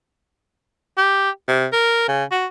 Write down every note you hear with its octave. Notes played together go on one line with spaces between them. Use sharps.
G4
C3
A#4
C#3
F#4